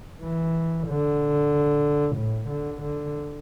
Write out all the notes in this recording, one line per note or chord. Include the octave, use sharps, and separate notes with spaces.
E3
D3
A2
D3
D3